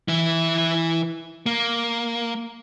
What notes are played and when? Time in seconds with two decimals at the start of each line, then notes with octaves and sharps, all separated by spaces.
0.08 E3 E4
1.46 A#3